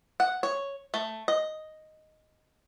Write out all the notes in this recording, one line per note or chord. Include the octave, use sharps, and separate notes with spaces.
F#5
C#5
A3
D#5